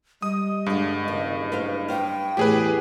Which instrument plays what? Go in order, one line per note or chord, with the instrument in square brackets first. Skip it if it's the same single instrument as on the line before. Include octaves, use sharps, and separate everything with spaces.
[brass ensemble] G3 [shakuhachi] D#5 [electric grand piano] D#6
[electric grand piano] G2 [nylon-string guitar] D3 G#3
[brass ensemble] F#1 [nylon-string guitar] D#3
[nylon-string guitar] B4 C5 F5
[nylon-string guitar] C5 F5 [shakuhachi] G5
[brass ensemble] E2 C3 E3 [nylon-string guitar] A2 [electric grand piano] G4 G#4 B4